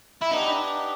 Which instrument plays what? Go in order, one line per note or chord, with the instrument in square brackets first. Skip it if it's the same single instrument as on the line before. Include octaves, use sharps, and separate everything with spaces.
[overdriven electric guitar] E4
[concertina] B3 D4 G4 [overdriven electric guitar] D#4